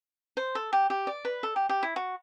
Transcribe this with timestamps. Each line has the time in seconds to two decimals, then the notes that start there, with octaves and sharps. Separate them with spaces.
0.37 C5
0.55 A4
0.73 G4
0.90 G4
1.07 D5
1.25 B4
1.43 A4
1.56 G4
1.69 G4
1.83 E4
1.96 F#4